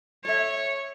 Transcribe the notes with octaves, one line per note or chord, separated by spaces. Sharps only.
A4 C#5 E5